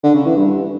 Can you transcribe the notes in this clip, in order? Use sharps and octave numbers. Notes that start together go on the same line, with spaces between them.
D3
C#3
E3
G2